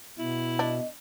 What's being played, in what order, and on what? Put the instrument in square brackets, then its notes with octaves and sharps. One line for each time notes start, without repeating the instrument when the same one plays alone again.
[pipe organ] B2 [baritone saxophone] E4
[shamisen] D4 [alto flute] D#5